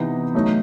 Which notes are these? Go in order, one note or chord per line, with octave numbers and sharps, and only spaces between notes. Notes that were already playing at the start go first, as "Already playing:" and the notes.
Already playing: C3 E3 B3 D#4
F#3 A3 D#4